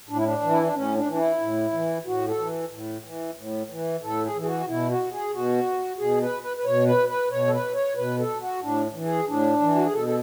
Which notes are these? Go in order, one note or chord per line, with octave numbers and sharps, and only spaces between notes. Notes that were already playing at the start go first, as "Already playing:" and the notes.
A2 D4
E4
D4
E3
E4
D4
A2 C#4
D4
E3
D4
E4
A2
E3
A2 F#4
A4
E3
A2
E3
A2
E3
A2 A4
G#4
E3
G#4
F#4
B2 E4
F#4
G#4
B2 F#4
B2 G#4
B4
B4
B4
B2 C#5
B4
B4
B2 C#5
A4
B4
C#5
B2 B4
A4
F#4
A2 D4
E3
G#4
A2 D4
E3
F#4
G#4
B2 A4
A4